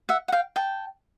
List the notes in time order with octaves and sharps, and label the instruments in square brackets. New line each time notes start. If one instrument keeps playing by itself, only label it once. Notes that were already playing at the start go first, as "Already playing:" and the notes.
[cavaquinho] E5 F#5
F#5
F5 G5
G5 A5